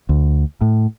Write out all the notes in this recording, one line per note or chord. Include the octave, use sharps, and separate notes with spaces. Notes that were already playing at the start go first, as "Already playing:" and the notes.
D2
A2